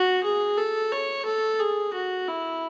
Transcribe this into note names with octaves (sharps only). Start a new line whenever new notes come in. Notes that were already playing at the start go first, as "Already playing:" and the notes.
Already playing: F#4
G#4
A4
C#5
A4
G#4
F#4
E4